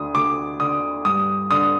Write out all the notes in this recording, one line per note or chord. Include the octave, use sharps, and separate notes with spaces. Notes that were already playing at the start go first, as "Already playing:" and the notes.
Already playing: D2 D3 D#6
D2 D6
D3 D#6
G2 D#6
D3 D#6